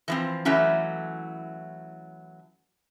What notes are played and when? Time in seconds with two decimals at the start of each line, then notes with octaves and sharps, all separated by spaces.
0.08 E3 F3 C4
0.45 E3 F#3 A3 C#4 E4